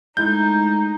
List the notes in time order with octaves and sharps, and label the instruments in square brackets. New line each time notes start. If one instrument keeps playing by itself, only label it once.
[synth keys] G#3 A3 E4 [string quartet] D#4 [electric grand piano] G6